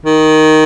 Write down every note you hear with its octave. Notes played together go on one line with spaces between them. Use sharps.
D#3